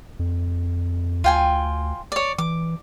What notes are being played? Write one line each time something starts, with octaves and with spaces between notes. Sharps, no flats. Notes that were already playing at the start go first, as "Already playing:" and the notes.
F2
D2 F4 G5 G#5
C#5 D5
E3 D6